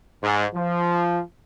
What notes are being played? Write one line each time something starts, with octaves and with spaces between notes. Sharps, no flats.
G#2
F3